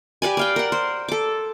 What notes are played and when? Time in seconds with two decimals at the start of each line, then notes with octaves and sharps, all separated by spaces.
0.22 G4 B4 D5 G#5
0.37 D5 F5 G5
0.56 A#4 F#5
0.72 C5
1.08 A4 D6